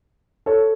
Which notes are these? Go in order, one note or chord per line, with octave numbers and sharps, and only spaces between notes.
A4 C#5